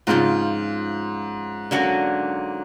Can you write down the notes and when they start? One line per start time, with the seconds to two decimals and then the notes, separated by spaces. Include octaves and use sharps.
0.07 G#2 C#3 F3 A3 C4 F4
1.71 D3 F#3 A#3 C#4 F#4